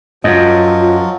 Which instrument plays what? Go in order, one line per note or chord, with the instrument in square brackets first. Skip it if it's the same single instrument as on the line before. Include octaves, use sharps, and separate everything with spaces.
[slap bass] F#2 [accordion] F3 F#3 [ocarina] F4 [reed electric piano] D#5